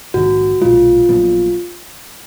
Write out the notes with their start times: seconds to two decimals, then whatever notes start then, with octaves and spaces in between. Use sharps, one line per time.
0.14 A#1 G#2 D#3 F#4
0.61 B1 A#2 F3 G#3 F4
1.09 A#1 A#2 F#3 B3